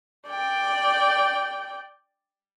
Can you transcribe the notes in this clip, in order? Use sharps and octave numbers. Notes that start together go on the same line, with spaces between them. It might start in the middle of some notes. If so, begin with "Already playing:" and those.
D5 G5